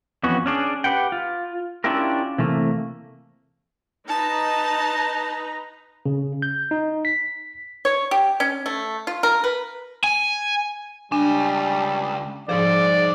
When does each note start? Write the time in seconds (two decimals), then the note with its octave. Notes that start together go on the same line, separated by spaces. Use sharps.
0.23 F2 E3 B3 C#4 F#4
0.46 C#4 D4 G#4
0.84 G4 B4 F#5 G5
1.12 F4
1.84 C#4 D4 E4 F4 G4 A#4
2.38 C3 E3 A3 A#3
4.08 D#4 B4 A5 A#5
6.06 C#3
6.42 G6
6.71 D#4
7.05 B6
7.85 C#5
8.11 G4
8.40 C#4
8.66 A3
9.07 F4
9.23 A#4
9.44 B4
10.04 G#5
11.12 C#2 G3 D4 G#5
12.49 G#2 F3 G#4 C5 D5